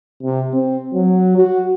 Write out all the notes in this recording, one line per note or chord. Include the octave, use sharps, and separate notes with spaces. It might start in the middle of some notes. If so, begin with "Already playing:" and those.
C3
C4
F#3
F#4